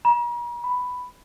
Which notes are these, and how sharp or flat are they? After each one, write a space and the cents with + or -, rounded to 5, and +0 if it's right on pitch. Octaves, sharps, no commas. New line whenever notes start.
A#5 +45
B5 +5